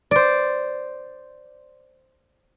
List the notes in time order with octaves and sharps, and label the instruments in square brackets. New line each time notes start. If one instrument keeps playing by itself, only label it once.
[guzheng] C5 D5